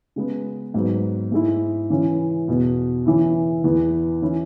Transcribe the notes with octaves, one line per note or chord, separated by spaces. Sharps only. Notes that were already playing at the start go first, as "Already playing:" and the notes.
C#3 G#3 B3
G#2 F#3 B3
G#2 G#3 E4
C#3 E3 C#4 E4
E2 B2 B3
C#3 E3 C#4 E4
E2 E3 B3 E4
E3 C#4 E4